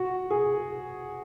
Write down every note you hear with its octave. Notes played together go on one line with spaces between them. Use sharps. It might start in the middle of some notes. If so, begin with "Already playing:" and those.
Already playing: F#4
G#4